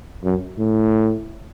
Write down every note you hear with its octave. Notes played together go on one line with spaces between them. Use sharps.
F#2
A2